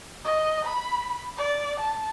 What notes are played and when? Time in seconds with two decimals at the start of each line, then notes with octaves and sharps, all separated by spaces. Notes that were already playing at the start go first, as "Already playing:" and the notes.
0.25 D#5
0.65 B5
1.37 D5
1.80 A5